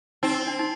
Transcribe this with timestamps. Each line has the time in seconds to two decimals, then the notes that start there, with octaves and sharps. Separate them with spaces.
0.23 C4 D#4
0.35 D#4
0.47 D4
0.59 D#4